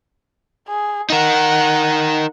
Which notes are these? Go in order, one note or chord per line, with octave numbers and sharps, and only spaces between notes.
G#4
D#4 A#4 F#5